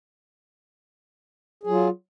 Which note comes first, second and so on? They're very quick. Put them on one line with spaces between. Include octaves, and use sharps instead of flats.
G#4 F#3 F4